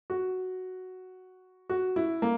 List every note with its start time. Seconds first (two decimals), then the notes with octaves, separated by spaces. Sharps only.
0.10 F#4
1.70 F#4
1.96 E4
2.22 A#3